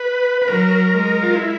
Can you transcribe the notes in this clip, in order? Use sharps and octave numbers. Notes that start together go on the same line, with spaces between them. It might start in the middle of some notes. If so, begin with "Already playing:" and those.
Already playing: B4
B4
F#3 A#4
G#3
F4
E4